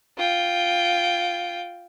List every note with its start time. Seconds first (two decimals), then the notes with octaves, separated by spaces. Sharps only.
0.18 F4 G5